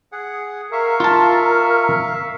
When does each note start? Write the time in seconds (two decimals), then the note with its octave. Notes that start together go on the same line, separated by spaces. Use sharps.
0.12 G#4 F#5
0.72 A#4 E5 F5 C#6
1.00 F4 A5